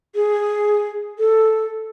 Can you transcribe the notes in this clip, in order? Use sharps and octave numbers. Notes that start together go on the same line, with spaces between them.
G#4
A4